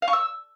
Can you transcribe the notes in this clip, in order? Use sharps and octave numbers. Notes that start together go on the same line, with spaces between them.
F5
C#6
E6